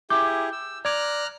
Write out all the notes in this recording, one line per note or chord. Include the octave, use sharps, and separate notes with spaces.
E4 G4 G#4 D6 G6
E6
D5 A#5 D6 F6 F#6 G#6